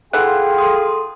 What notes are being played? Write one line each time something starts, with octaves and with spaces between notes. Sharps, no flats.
E3 F4 G#4 A4 F#5 G5
A4 C6 D#6